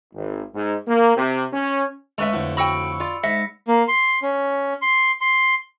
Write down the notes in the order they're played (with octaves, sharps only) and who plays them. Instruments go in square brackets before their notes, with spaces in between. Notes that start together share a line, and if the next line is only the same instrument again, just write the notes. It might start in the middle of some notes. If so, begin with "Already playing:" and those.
[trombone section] G#1
G#2
A#3
C3
C#4
[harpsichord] C#3 G#3 [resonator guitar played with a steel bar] A3 B4 E5
[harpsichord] F2 A2 D3
[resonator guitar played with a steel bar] F#4 G5 [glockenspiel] B5 E6 C#7
[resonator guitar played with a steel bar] F4 D5
[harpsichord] G#2 [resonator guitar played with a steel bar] E5 [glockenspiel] A#6 B6 C#7
[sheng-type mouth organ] A#3
C6
C#4
C6
C6